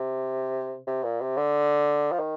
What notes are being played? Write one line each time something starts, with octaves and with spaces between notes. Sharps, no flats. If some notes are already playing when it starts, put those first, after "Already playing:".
Already playing: C3
C3
A#2
C3
D3
F3
D#3